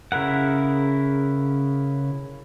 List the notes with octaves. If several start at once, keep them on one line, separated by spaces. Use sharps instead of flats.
C#3 E4 A#4 F#5